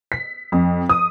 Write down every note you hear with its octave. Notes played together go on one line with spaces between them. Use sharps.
B6
F2
D#6